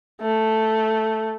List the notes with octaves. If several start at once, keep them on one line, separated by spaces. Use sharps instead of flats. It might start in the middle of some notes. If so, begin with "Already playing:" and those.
A3